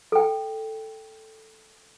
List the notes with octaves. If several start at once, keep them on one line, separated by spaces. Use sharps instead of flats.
A4 G5